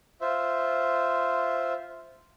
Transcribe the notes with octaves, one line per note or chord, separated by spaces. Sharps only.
F4 C5 E5